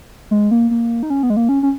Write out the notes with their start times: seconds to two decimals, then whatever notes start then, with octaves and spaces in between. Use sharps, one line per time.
0.31 G#3
0.51 A#3
0.71 A#3
1.03 D#4
1.10 C#4
1.23 B3
1.30 G#3
1.37 A#3
1.49 C#4
1.63 C#4